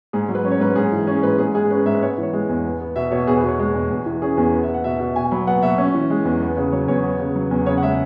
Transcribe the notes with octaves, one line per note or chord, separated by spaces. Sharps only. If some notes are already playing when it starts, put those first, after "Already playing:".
G#2 G#4
F#3
B4
C#4
C#5
G#2 B4
G#2 G#4
E3
C#4 G#4
G#2 B4
G#2 G#4
G#3 G#4
C#4 B4
G#2 E5
B4
B3 C#5
E3 C#5
G#3
E2
B3
B3
B2 E5
B2 C#5
E2 G#4
B4
B2 C#5
G#3
E2
E2
E3
C#4 G#4
E2 G#4
B3
E5
B3
F#5
B2 E5
B2 E5
B2 G#5
F#3 B5
B3 F#5
B2 E5
C#4
E3
G#3
E2
B3
C#3
F#3 C#5
E2 C#5
B3
C#3
F#3
E2
C#3 C#5
F#5
G#3 E5